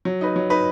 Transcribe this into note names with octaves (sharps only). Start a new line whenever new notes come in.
F#3
D#4 B4
F#3
D#4 B4